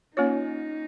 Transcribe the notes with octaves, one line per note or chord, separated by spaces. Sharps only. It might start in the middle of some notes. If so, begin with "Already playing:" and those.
A#3 C#4 D#4 F4 C#5